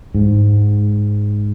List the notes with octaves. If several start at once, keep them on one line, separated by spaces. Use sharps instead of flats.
G#2